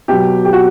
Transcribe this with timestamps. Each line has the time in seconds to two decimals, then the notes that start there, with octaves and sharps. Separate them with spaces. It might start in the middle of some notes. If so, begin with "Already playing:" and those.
0.08 B2 F#3 G4
0.45 G4
0.53 F#4